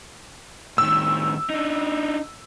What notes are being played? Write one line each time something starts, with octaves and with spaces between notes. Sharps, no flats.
A2 D#3 E6
D4 D#4